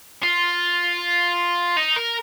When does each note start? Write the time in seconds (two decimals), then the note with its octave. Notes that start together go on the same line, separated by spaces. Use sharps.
0.23 F4
1.77 D#4
1.96 A#4